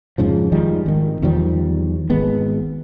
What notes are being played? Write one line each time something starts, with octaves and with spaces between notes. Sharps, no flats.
F2 G#2 C#3 F3
D#3 F3 G3 G#3
G#1 D#3
E2 D#3 F3 G3
G#1 G#3 B3